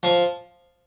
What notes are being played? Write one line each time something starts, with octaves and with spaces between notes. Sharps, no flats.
F3